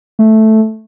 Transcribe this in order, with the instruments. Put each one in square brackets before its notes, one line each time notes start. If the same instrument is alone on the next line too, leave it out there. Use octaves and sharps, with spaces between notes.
[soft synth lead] A3